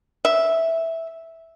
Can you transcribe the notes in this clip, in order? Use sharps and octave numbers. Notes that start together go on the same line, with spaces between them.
E5